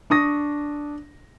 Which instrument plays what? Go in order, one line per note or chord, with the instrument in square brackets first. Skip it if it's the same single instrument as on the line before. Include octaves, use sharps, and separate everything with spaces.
[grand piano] D4 C#6 D#6 A#6